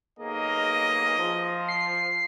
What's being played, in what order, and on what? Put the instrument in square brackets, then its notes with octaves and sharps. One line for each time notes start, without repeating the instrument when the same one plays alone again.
[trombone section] B1 A#3 G#4 [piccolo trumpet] D#5
[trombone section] F3
[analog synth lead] C7